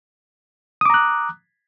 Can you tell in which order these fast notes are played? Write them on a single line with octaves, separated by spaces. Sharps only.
D#6 D6 A#5 F#6